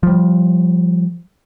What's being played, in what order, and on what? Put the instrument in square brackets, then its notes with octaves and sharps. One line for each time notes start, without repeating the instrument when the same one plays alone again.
[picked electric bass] F3 G3